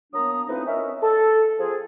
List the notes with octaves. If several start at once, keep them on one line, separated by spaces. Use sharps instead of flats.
F#3 A#3 B3 D4 A#5 D#6
F3 A3 C4 D#4 E4 B4
C#4 D#4 A#4 E5
A4
F3 C4 F4 G#4